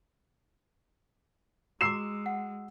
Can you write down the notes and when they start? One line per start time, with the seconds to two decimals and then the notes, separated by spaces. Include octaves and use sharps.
1.81 G#3 F#4 A#5 D6 E6 C7 E7
2.26 F#5